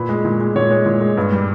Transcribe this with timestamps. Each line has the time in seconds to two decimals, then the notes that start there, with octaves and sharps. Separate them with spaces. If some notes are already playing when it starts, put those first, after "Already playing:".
Already playing: A#2 B4
0.09 G#3
0.25 A#2
0.40 G#3
0.55 A#2 C#5
0.71 G#3
0.86 A#2
1.01 G#3
1.17 G2
1.32 G3